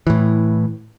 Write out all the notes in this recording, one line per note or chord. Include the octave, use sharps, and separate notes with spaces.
A2 E3